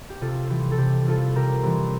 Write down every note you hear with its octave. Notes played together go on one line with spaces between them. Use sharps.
G4
C3 F4 A4
E3 G3 C4 G4
A4
C3 G4
E3 G3 C4 F4 A4
C3 G4 A#4
E3 G3 C4